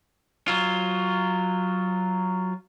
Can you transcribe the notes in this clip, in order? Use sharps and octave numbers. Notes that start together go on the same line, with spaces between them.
F#3 F4